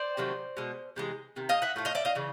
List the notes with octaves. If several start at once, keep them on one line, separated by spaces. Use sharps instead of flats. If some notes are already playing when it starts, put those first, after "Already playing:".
Already playing: C5 D5
C3 D#3 F#3 A3
B2 G#3
C3 E3 G#3
C3 D#3
D#5 F5
E5 F#5
A2 F3 A3
D#5 F5
D5 E5
D#5 F5
C#3 E3